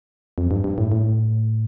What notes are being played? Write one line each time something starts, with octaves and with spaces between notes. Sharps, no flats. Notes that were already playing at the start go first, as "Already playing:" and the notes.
F2
G2
G2
A2
A2